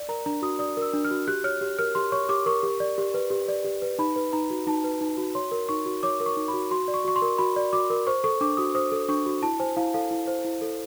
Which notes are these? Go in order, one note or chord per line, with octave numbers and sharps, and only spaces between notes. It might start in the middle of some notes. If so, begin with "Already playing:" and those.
Already playing: D5
A#4 A#5
D4 A#5
F#4 D#6
D5 D#6
A#4 E6
D4
F6
F#4
G4 F#6
C#5 F6
G4
A#4 F6
G4 C6
C#5 C#6
G4 D6
A#4 C#6
G4
D5
G4
B4
G4
D5
G4
B4
D#4 B5
B4
D#4 A#5
F#4
D#4 A5
B4
D#4
F#4
C#5 C6
A#4
D#4 C#6
F#4
C#5 D6
A#4
C#6
D#4
B5
F#4
F#4 C6
D5
C#6
F#4 C#6
C6
A#4
F#4 B5
D5
F#4 D6
A#4
C5 C#6
A4 C#6
D4 D6
F#4 D#6
C5 D#6
A4
D4 C#6
F#4
E4 A5
C5 G#5
E4 F5
A4 F5
E4
C5
E4
A4